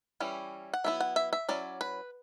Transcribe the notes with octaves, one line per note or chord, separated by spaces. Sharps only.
E3 G3 C#4 E4
F#5
F#3 B3 E4 E5
F#5
E5
E5
F#3 C#4 E4 D5
B4